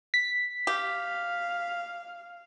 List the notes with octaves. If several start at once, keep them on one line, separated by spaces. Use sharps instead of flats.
B6
G4 F5